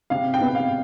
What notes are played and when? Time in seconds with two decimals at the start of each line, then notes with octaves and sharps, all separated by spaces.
0.10 C3 F5
0.34 G5
0.41 B3
0.55 F5